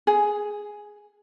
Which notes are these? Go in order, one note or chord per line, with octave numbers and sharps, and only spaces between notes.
G#4